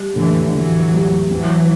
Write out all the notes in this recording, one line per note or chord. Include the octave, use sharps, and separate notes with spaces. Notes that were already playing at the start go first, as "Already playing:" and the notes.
Already playing: G3
A2 D3 E3
A2 E3 F#3
G3
E3 F#3 C4